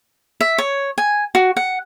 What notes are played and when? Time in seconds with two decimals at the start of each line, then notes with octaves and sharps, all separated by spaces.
0.41 E5
0.58 C#5
0.98 G#5
1.35 F#4
1.57 F#5